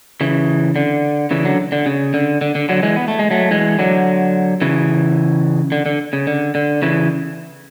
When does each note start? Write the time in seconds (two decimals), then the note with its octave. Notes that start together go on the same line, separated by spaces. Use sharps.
0.21 C#3 E3
0.76 D3
1.31 C#3 E3
1.45 D3 F#3
1.72 D3
1.86 C#3
2.14 D3
2.41 D3
2.55 D3
2.69 D3 F#3
2.83 E3 G#3
2.96 B3
3.08 A3
3.19 G#3
3.31 F#3 A3
3.51 E3 G#3
3.79 D3 F#3
4.61 C#3 E3
5.72 D3
5.86 D3
6.13 C#3
6.27 D3
6.55 D3
6.82 C#3 E3